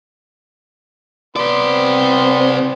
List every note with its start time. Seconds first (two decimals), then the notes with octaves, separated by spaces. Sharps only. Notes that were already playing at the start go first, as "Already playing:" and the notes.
1.36 C3 B3 D5 C6
1.69 C4